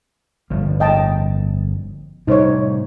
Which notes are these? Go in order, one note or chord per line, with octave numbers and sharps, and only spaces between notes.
G1 A2 F3
D#5 G5 A5
A2 C3 G3 D#4 C5 C#5